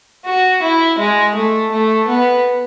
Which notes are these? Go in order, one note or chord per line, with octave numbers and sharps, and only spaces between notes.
F#4
E4
G#3
A3
A3
B3